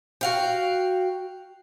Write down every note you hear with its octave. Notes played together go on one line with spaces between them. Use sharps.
F#4 F5 G5